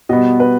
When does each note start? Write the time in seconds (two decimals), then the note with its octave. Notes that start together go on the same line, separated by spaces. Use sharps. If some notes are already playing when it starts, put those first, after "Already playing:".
0.09 B2 G3 B3 D#5
0.40 B4